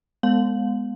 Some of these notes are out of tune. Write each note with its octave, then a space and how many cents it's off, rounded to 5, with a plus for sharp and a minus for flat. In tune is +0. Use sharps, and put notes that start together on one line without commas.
G#3 +0 B3 +0 F5 +30